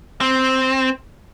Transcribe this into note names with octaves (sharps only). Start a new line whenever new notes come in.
C4